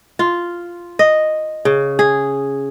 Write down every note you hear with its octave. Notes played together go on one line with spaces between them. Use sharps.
F4
D#5
C#3
G#4